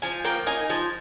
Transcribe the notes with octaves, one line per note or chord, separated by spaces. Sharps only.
F3 G#5
A#3 G5
D#4 G#5
F3 G#5